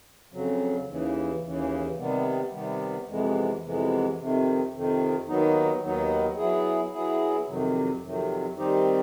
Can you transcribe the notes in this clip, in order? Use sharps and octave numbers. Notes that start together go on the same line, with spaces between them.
F2 C#3 F#3
D#2 C#3 E3
D#2 C#3 E3
C3 D#3 G3 B3
C3 D#3 G3 B3
F2 C3 E3 G#3 B3
F2 C3 E3 G#3 B3
F2 C3 D#3
F2 C3 D#3
D#2 D#3 F#3 B3 D#4
D#2 D#3 F#3 B3 D#4
F#3 B3 E4 G#4
F#3 B3 E4 G#4
F2 C3 D#3 F#3
F2 C3 D#3 F#3
D#3 G3 C4 D#4 G4